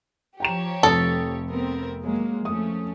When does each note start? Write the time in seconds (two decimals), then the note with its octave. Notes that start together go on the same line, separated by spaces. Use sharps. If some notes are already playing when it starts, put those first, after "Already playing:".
0.40 F3 G4 C#5 G5 A#5 E7
0.83 F1 A4 D#6
1.50 B3 C4 A#4
2.01 F#3 G#3 A#3
2.45 F2 A3 C#4 D#6